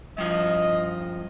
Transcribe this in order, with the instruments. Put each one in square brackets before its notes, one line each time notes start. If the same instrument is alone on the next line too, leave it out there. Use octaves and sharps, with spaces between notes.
[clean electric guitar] G2 F3 [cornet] D#5